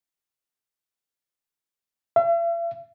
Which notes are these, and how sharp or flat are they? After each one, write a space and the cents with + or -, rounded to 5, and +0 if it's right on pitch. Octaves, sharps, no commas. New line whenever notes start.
E5 +45